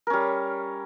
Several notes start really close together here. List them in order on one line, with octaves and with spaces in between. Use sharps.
A#4 C#4 G3